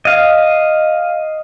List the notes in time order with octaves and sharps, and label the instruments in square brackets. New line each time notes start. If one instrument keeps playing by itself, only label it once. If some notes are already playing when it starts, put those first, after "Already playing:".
[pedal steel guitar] D#5 F5